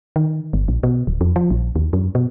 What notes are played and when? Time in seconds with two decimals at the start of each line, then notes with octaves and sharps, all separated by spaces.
0.16 D#3
0.53 G1
0.68 A#1
0.83 B2
1.07 D1
1.21 F2
1.36 F3
1.51 A#1
1.76 D#2
1.93 F#2
2.15 B2